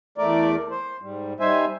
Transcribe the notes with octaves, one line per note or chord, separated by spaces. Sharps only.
E2 A3 A#4 D5
C5
G#2 G3
G3 D#4 C5 E5 G#5